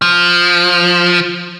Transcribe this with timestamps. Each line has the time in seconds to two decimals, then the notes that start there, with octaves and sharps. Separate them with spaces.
0.02 F3